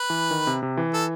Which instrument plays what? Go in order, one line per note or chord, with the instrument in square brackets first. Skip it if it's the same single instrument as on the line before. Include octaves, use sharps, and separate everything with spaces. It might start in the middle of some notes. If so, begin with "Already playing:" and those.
Already playing: [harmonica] B4
[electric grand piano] E3
D#3
C3
C3
E3
[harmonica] A4